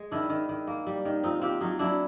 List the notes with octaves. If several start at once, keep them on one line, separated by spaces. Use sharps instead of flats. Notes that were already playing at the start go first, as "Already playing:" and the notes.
Already playing: G#3
D#3 D4 E4
D#3
D#3
A#3
G3
D#3
C4 D#4 F4
C4 F4 G4
F#3 D#4 F4
F#3 D4 E4